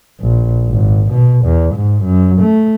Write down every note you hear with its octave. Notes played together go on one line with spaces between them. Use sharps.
A#1
G#1
B2
E2
G#2
F#2
A3